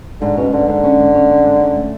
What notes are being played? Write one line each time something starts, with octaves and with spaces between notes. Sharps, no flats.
G#2 D3
B2 C#4
G#2 D3
G#2 D3
C#4
G#2
C#4
C#4
G#2
C#4
A3